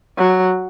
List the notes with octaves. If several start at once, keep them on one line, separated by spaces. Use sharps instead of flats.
F#3